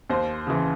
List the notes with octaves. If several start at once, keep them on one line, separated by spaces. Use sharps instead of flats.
D#2 C5
C#3 E3